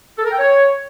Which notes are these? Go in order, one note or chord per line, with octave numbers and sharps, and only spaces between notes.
A4
A#4
G5
C#5